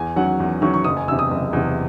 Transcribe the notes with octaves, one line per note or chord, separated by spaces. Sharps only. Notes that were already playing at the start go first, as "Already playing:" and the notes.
Already playing: E2 G#5
D#3 F#3 C#4 F#5
E2
D#3 F#3 C#4 C#6
C#6
F#1 D#6
G#5
E2 C3 E6
D#6
F#1
E2 C3